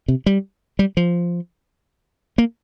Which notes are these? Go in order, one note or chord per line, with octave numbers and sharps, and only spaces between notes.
C3
G3
G3
F3
A#3